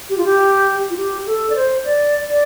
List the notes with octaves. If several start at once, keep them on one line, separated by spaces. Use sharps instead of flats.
G4
F4
G4
F4
G4
A4
D5
C5
D5
D5